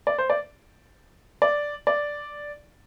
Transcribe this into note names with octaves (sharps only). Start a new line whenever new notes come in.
D5
C5
D5
D5
D5